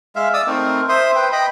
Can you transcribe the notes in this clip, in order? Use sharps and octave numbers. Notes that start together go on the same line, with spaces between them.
G#3 E5 F5
D5 D#6 E6
A3 C4 D#4 A#4
C5 E5 C6 D#6
B4 G5
D#5 G5 B5